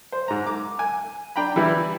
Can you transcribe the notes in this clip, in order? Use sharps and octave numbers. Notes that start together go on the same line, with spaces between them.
C5
G#2 A#5
D6
G#5
D4 G5 A#5 B5
E3 G3 E4